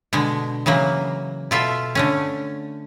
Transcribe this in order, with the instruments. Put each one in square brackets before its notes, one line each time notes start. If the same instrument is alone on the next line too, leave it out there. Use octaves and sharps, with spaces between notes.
[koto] B2 D3 G#3
C#3 E3 F#3 A#3
B2 F4 A4 E5
D3 A3 C#4